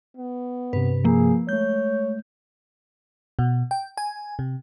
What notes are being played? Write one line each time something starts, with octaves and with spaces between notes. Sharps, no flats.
B3
G2 C3 B4
F3 A#3 G#4
G#3 A3 C#5 G6
B2
G5
G#5
C3